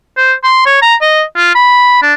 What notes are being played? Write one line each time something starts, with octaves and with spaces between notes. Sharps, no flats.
C5
C6
C#5
A#5
D#5
F4
B5
D4